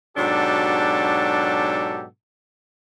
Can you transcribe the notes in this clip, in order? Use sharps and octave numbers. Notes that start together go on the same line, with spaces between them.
G#2 B2 F#3 D4 G4 A4